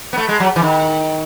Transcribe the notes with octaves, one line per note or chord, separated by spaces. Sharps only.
B3
A3
G#3
F#3
E3
D#3